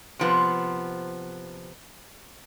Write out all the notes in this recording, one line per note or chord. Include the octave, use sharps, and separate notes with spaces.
C3 F3 B3